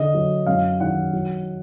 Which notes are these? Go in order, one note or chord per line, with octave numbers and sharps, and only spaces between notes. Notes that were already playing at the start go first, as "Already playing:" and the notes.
Already playing: D3 D#5
F#3
F#2 F5
D#3 F#5
F#3